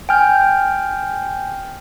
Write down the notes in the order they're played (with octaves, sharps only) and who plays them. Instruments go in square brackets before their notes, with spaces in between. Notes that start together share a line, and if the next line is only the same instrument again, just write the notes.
[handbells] G5 G#5 F6 G6